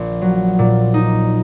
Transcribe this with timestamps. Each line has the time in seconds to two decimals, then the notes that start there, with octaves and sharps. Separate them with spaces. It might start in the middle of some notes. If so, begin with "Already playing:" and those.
Already playing: A#1
0.22 F#3
0.59 A#2
0.94 D#4